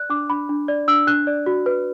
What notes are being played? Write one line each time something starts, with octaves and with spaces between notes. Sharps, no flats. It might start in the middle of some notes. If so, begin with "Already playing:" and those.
Already playing: D5 F#6
D4 D6
D4 B5
D4
D5
D4 E6
D4 F#6
D5
F#4
B4